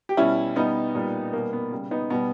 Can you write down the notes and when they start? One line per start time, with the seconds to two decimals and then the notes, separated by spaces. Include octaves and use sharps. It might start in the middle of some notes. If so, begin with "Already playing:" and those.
0.09 G4
0.17 B2 G3 C#4 E4
0.56 B2 G3 B3 D#4
0.95 A#2 G3
1.33 B2 G3 A#3
1.53 B3
1.72 C#3 G3
1.91 B3 D#4
2.10 B2 G3 B3